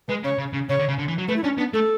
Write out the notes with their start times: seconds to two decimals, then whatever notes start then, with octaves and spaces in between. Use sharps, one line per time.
0.08 G#3 B4
0.24 C#3 C#5
0.38 C#3
0.53 C#3
0.69 C#3 C#5
0.79 D3
0.88 C#3
0.99 D3
1.08 E3
1.18 F#3
1.28 A3 B4
1.36 E4
1.43 C#4 D4
1.58 B3 D4
1.74 A3 A4